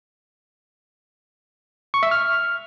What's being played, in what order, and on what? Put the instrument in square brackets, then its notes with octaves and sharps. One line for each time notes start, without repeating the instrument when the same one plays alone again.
[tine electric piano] C#6
E5
F6